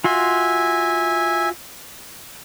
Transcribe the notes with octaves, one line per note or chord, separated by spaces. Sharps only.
F4 F#4 E5 G#5 C6